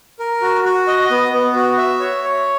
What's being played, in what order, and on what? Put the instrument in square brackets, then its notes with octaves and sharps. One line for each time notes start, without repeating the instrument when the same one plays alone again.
[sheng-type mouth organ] A#4
F#4
F#4
D#5
B3
B3
F#4
E5
C#5
C#5